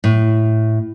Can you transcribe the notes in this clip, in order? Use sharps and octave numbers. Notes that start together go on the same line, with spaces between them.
A2